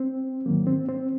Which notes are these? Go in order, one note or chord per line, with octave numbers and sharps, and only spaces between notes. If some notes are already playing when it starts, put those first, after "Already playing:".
Already playing: C4
G#2 D#3 F#3 A#3
C4
C4